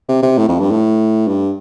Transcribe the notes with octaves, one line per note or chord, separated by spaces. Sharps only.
C3
C3
A2
F2
G2
A2
G2